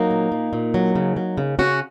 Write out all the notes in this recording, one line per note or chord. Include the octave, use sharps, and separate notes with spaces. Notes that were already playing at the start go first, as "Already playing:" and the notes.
Already playing: F#3 A#3 D#4
A#2
A#2
A#2
F#3
C#3
F#3
C#3
C#3 C#4 F#4